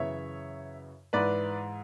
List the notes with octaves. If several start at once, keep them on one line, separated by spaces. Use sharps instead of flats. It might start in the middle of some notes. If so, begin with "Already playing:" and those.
Already playing: F#2 C#3 E3 C#5 E5
G#2 E3 B4 D5